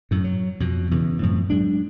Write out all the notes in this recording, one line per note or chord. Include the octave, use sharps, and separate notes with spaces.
F#2 A2
F#3
F2 B2
E2 C#3 E3
F#2 A2 F3 C4
F#3 G#3 D4